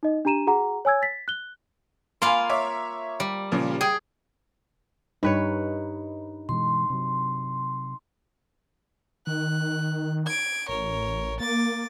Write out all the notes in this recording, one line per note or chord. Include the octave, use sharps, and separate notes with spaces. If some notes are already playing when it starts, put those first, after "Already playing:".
D#4 D#5
D4 G4 A#5 D#7 E7
F#4 G#4 F#5 A#5
C#5 G#5 E6 G#6
A6 B6
F#6 G7
A#3 F4 F5 G#5 B5 C6
C#5 E5 D6
G3
A#2 C#3 F3
G#4 G5
G2 D#4 B4 C#5
B2 E3 G#3 C6
C3 F#3
D#3 F#6
G#6 D7
A1 A#4 C#5
A#3 D6 A6